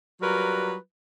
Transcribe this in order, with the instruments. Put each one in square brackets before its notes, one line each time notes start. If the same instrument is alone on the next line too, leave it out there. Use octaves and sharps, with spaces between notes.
[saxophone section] F#3 G3 F4 A#4 B4